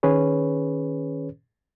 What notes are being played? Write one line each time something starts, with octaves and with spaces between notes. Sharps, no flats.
D#3 C#4 G#4 B4 C#5